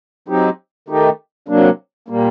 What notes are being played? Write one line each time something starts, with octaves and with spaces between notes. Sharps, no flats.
F#3 C4 D#4 G4
D#3 A3 D#4 G4
C3 F#3 A#3 D4
A#2 G3 A#3